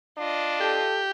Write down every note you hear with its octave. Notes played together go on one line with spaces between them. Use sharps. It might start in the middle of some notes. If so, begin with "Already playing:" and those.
D4 F4 D#5
G4 A4